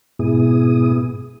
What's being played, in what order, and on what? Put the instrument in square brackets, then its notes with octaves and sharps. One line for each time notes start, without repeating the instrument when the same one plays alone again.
[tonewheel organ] G#2 B2 B3 E4 G#4 D#6